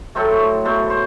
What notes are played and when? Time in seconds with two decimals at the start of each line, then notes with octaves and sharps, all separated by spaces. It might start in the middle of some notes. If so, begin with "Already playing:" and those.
0.15 A2 F#3 A3 C5
0.41 C5
0.65 B2 F#3 A3 C5
0.90 C5